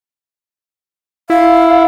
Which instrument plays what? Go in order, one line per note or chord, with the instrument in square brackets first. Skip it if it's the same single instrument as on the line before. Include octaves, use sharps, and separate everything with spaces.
[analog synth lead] E4 [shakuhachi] F5